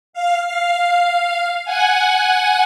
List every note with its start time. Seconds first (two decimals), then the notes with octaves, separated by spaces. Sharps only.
0.13 F5
0.46 F5
1.65 F#5 G#5